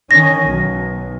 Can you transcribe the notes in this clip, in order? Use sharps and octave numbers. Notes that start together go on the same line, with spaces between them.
D#3 C#4 A#6
B1